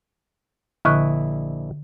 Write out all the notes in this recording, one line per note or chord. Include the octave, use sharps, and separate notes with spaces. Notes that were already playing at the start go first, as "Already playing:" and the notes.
A#1 D3 E4 D#5 C#6 F#6